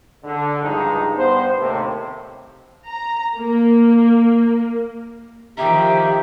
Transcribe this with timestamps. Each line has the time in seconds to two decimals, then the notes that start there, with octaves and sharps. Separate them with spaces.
0.24 D3
0.62 C#2 G2 F3 G#3 D#4
1.17 G2 B3 C5
1.59 D#2 A2 C3
2.86 A#5
3.37 A#3
5.57 D#3 F3 G4 E5 A#5